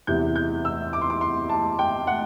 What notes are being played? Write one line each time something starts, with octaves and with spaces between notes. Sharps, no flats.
E2 C3 E3 G6
G6
E6
D6
C6
D6
C6
A5
G5
F#5